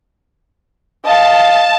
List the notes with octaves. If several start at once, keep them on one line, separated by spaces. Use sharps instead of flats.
D#5 F5 A5